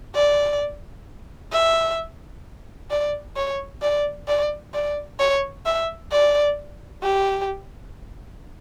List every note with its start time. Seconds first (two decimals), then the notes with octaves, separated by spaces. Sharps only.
0.15 D5
1.52 E5
2.90 D5
3.36 C#5
3.82 D5
4.28 D5
4.74 D5
5.20 C#5
5.65 E5
6.12 D5
7.03 G4